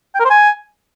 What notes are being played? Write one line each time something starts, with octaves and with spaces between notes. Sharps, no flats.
G5
A#4
C5
G#5